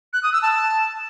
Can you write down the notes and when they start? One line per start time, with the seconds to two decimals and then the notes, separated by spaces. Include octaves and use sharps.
0.13 F#6
0.23 D#6
0.33 E6
0.42 A5